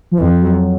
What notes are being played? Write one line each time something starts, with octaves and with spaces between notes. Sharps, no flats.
F3
F2 E3
F3
F#3